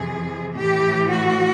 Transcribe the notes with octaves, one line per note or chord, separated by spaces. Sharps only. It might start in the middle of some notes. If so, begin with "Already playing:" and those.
Already playing: F2 C3 E3 G#4
A2 E3 G4
F#4